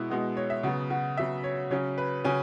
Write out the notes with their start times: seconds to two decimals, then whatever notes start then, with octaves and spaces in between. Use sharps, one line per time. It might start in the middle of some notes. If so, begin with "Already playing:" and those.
Already playing: B2 G#3 B3 E4
0.10 B2 G#3 B3
0.37 C#5
0.50 E5
0.63 C#3 F#3 B3 F#4
0.90 F#4
1.17 C#3 F#3 B3 E5
1.44 C#5
1.70 C#3 F#3 C#4 C#5
1.98 B4
2.25 C#3 F#3 C#4 G#5